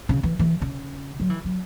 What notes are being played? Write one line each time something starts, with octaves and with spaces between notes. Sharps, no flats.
C#3
E3
E3
C#3
F#3
E3
F#3